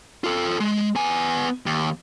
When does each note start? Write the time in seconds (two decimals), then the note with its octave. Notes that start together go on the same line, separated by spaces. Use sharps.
0.24 F4 A4
0.60 G#3
0.96 B3 G#5
1.66 D#2